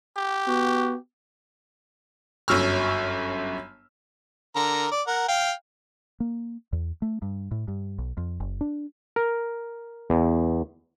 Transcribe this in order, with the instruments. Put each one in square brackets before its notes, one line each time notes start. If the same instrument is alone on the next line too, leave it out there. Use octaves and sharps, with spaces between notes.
[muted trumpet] G4
[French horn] B3 [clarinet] F#4
[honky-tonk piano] G1 F#2 F#3 C#6 E6 F6
[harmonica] D3 A#4 A#5
D5
A#4 F#5
F5 G5
[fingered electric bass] A#3
E2
A3
G2
A2
G2
B1
F2
F#1
D4
[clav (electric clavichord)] A#4
E2